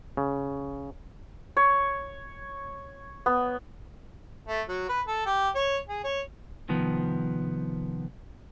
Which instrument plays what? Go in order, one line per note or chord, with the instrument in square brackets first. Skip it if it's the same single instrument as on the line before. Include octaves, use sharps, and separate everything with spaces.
[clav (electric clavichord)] C#3
[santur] C#5
B3
[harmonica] A3
F#3
B4
A4
G4
C#5
G#4
C#5
[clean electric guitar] C2 D#3 F3 B3